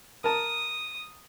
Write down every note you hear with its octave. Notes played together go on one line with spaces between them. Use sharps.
A#4 A5 D#6